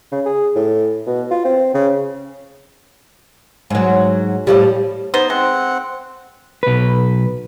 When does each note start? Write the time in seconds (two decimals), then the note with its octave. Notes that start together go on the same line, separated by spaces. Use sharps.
0.12 C#3
0.25 G#4
0.56 A2
1.07 B2
1.31 F4
1.45 C4
1.74 C#3
3.70 G#2 F#3
4.47 A2 F3 G3 G4
5.14 B3 D#4 C5
5.30 G#3 C4 F#5
6.63 B1 B4